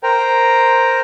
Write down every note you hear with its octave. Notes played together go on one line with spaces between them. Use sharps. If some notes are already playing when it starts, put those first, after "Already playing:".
A#4 C5 G5 A#5